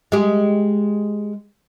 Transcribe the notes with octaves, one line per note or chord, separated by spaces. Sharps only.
G#3 G4